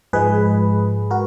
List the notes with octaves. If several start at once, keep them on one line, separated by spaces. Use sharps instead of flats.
G#2 F3 G#3 G#4 B4
F#4 A#4